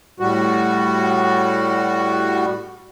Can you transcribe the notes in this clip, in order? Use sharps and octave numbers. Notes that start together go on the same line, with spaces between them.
A2 G3 F#4